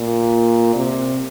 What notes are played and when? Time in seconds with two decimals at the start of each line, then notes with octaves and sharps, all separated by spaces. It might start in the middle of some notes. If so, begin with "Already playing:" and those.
Already playing: A#2
0.76 C3